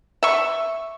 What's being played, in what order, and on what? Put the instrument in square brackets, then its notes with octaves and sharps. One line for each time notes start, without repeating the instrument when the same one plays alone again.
[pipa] E5 C#6